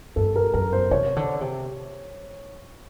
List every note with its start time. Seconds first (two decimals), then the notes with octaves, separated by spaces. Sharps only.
0.16 G2 A4
0.36 A#4
0.54 F#2 A#4
0.73 C5
0.91 C3 C#5
1.16 D3
1.41 C3